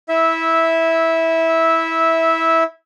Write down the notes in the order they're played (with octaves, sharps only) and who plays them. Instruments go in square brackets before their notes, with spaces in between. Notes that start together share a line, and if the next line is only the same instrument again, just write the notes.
[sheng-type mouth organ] E4 E5